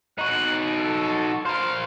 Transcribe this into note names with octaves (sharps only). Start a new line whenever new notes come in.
D#4 F#4 F#6
A4
A#4 C5 F5